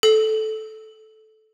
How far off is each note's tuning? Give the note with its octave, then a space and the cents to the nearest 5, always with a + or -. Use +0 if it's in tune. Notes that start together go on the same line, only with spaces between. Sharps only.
A4 -15